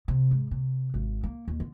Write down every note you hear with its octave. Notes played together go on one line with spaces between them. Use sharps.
C3
G#2
C3
G#1
A#3
D#2
D3